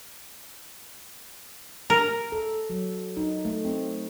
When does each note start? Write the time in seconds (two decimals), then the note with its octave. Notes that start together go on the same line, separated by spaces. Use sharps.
1.90 A#4
2.32 A4
2.70 F#3
3.17 D#4
3.45 A3
3.65 C4